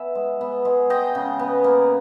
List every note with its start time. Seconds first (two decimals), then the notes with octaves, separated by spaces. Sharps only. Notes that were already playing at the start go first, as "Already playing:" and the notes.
Already playing: B3 E5 G#5
0.15 G#3
0.41 B3
0.65 G#3
0.90 G#3 D#5 G5
1.15 C#3
1.39 B3
1.64 A#3